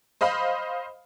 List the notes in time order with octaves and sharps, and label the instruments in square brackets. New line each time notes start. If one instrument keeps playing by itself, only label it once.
[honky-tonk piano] C5 D#5 F5 B5